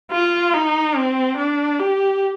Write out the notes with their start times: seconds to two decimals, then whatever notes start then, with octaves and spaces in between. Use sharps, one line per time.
0.11 F4
0.54 D#4
0.96 C4
1.37 D4
1.79 G4